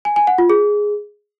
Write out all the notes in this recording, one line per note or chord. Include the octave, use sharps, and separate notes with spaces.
G#5
G#5
F#5
F4
G#4